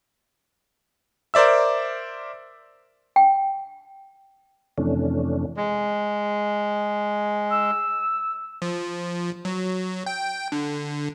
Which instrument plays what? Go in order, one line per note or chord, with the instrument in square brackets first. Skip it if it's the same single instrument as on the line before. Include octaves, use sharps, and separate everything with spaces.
[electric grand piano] A#4 C5 D5 E5 E6
[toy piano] G5
[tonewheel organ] F2 C3 E3 A3 C#4 D4
[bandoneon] G#3
[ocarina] E6
[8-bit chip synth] F3
F#3
G5
D3